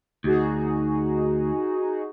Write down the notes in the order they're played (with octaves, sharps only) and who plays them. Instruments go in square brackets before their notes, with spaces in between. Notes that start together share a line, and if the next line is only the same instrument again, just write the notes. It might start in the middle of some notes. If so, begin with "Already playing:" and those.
[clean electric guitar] D2 [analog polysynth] D#4 F#4 G#4